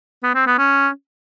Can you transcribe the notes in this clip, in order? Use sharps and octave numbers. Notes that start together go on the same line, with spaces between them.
B3
C4
B3
C#4